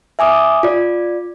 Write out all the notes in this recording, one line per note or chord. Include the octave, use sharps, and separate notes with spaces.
E5 G#5 D6 D#6
F4 D5